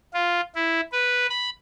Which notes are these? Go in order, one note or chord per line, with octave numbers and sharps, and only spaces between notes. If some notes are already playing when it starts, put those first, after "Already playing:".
F4
E4
B4
B5